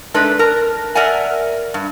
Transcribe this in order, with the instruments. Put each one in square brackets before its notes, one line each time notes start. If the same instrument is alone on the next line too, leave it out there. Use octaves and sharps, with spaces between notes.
[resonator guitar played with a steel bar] G#3 A3 D4 D#4 B4
A#4 A5
A#4 D5 E5 F#5 G#5
G2